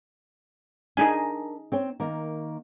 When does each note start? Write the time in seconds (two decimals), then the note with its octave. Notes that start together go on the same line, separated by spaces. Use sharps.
0.97 D4 D#4 G#4 A#4 G#5
1.72 C4 C#5 G5
2.00 D#3 A#3